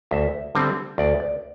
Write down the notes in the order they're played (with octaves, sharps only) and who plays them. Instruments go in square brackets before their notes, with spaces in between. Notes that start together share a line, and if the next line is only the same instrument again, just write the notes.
[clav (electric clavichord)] D2 E5
D3 G3 C4
D2 D5
D5